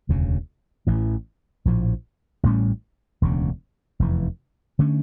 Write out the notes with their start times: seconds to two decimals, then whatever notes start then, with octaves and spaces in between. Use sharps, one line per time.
0.09 E1 D2 C#3
0.87 A1 A2 E3
1.65 A#1 A2 F3
2.43 A1 A2 G3 C#4
3.22 E1 D2 C#3
4.00 F1 E2 E3
4.79 D3 A3 C#4